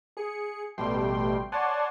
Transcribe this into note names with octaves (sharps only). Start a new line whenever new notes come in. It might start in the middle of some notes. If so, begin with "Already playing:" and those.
G#4 C#7
A1 B2 G3 A3 G5 C6
C#5 D5 F#5 G#5 A5 C6